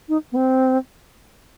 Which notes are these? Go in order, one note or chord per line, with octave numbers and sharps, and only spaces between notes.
D#4
B3
C4